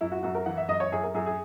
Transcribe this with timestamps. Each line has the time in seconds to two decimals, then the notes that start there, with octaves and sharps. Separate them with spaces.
0.01 F#2 E4
0.12 F#4
0.23 F#2 F#4
0.35 A#4
0.46 E3 F#5
0.57 E5
0.68 F#2 D#5
0.80 C#5
0.92 F#2 G#4
1.03 A#4
1.14 F#2 G#4
1.26 G#4